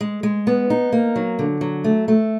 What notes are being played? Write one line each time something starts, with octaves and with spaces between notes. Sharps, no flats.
G#3
G#3
B3
D#4
A#3
F#3
D3
F#3
A3
A3